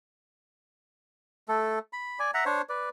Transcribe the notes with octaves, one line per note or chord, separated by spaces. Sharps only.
A3 A4
B5
D5 G#5
E5 F#5 A#5
D4 C5 C#5
B4 D5